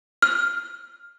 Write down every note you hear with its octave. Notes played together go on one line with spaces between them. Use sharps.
F6